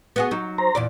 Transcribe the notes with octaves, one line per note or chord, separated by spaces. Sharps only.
B3 F#4 G#4
F#3 D#4
C5 A#5
E2 A#2 D5